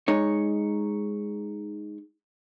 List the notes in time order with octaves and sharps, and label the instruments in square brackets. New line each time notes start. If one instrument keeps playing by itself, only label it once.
[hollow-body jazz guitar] G#3 D#4 C#5